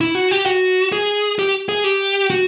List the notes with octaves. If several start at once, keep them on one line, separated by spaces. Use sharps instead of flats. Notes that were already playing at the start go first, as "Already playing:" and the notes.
E4
F#4
G4
F#4
G#4
G4
G#4
G4
F#4